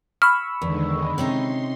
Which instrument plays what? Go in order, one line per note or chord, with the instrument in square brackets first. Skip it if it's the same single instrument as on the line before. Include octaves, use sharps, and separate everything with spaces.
[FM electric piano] B5 C#6 E6 [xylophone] F6
[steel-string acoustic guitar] E2 [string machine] D3 D#3 G#3
[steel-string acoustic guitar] C3 C#4 D#4 [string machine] C6